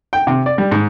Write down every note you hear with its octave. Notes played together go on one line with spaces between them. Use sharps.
G5
C3
D5
G3
G#2